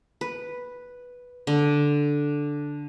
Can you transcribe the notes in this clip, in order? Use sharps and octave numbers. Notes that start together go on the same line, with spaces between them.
B4
D3